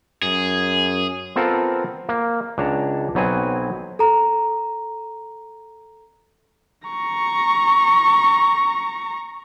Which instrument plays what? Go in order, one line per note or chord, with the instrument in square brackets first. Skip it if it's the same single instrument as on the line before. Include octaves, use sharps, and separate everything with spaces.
[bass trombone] F#2 [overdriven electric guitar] G#4
[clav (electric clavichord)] B3 C4 F4 A4 A#4
A#3
C#2 D4 C#5 A5 A#5
B1 F#3 B3 C4 G#5
[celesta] A4 A#5
[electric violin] A#5 C#6